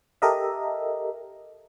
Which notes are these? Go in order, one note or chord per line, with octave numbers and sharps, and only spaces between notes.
G4 A4 A#4 D#5 E5